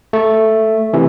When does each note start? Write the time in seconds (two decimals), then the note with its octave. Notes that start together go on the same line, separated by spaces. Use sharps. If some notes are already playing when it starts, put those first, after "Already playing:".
0.13 A3
0.93 C3 E3